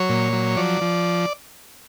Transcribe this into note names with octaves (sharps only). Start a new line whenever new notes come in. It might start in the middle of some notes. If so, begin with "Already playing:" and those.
Already playing: F#3 C#5
A#2
F#3
F3 D5
F3